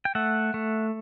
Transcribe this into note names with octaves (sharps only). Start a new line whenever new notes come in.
G5
A3 E5 F#5
A3